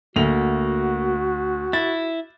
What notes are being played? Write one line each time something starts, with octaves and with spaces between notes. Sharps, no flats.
D2 A#3 F#4 F7
E4 A6